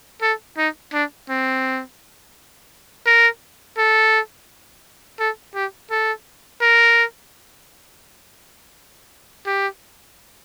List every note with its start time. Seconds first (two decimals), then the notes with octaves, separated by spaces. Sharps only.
0.22 A4
0.58 D#4
0.93 D4
1.29 C4
3.06 A#4
3.77 A4
5.19 A4
5.55 G4
5.91 A4
6.61 A#4
9.46 G4